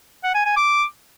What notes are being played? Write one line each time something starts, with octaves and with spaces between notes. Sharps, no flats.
F#5
G#5
G#5
D6